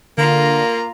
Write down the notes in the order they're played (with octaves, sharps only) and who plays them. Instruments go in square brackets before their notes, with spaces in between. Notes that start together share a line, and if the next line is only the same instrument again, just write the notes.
[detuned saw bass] D3 [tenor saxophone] A#3 [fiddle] F4 A#5